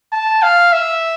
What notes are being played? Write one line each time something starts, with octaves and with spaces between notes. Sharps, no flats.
A5
F5
E5